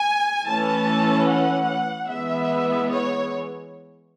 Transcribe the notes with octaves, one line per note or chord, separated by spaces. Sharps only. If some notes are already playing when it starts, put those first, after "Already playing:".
Already playing: G#5
E3 A3 C#4 A5
F#5
E3 G#3 B3 E5
C#5